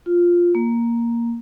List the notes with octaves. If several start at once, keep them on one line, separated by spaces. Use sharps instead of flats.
F4
A#3